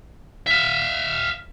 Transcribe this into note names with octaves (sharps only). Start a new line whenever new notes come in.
E5 F5